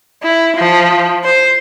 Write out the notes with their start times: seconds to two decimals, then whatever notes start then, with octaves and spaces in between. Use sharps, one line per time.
0.23 E4
0.57 F3
1.24 C5